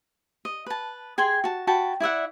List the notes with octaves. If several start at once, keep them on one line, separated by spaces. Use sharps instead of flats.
D#5
B4 A5
G#4 G5 G#5 C6
F#4 A5
F#4 G5 A5 B5
E4 D5 E5 F#5